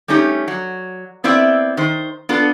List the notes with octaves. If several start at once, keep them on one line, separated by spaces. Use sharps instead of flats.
G3 A3 C#4 D#4 G4
F#3
B3 C4 E4 D5 E5
D#3 C5
B3 D4 F4 A4